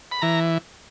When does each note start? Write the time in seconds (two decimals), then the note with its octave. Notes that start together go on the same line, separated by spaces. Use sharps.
0.12 B5
0.22 E3 A#5